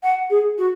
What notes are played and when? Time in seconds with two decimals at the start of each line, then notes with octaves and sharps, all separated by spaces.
0.03 F#5
0.30 G#4
0.58 F#4